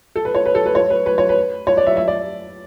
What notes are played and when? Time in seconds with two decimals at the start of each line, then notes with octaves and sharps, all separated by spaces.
0.16 A4
0.25 B4
0.35 C#5
0.46 B4
0.55 A4
0.66 B4
0.75 C#5
0.90 B4
1.06 B4
1.18 C#5
1.29 B4
1.67 C#5
1.77 D5
1.87 E5
1.97 E5
2.08 D5